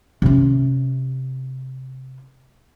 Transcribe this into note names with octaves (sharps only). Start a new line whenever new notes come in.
C3 C#4